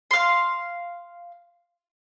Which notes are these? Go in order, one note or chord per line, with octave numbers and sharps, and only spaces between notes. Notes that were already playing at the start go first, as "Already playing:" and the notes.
F5 C6